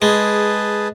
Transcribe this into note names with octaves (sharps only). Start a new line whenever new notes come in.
G#3 G#4 B4 A5